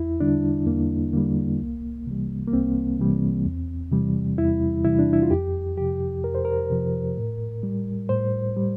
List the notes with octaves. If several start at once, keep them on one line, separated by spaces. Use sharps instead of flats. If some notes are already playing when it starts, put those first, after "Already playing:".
Already playing: E2 E4
D3 G3 D4
E2 A#3
D3 G3 A#3
C2
C3 E3 G3
A#3
C2 C4
C3 E3 G3
E2
C3 E3 G3
E2 E4
C3 E3 G3 E4
D4
E4
F4
F2 G4
C3 F3 G4
F2 A#4
C5
A#4
C3 F3
A2
G3
A2 C5
G3